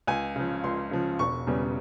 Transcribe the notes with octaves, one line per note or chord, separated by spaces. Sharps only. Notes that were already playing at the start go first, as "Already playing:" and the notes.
C#2 G#5
C#3 F3
C#2 C6
C#3 F3
E1 C#6
E2 C#3 G3